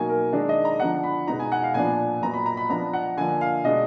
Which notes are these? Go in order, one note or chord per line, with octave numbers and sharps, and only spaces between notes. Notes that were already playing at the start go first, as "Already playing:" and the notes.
Already playing: B2 F#3 A#3 D#4 G#5
A#4
D#3 G#3 D4
D#5
A#5
D3 F3 B3 D4 F#5
B5
B2 G#3 B3 D#4 A#5
G#5
F#5
F5
A#2 F3 B3 D4 G#5
A#2 F#3 B3 A#5
B5
A#5
B5
F3 B3 D4 A#5
F#5
D3 F3 A#3 D4 G#5
F5
B2 G#3 D4 D#5